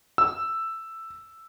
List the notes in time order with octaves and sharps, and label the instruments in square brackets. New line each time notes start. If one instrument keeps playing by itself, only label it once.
[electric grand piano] E6